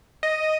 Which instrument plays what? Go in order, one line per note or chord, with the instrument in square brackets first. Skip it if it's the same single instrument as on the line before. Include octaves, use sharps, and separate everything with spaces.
[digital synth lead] D#5